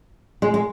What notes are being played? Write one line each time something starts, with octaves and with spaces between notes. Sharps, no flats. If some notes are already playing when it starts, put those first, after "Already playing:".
G#3
G#3